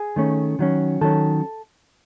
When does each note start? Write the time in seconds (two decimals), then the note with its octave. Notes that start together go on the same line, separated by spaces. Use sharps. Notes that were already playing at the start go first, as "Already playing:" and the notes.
Already playing: G#4
0.16 D#3 A3 C#4
0.59 D#3 F#3 C#4
1.01 D#3 F#3 C#4 A4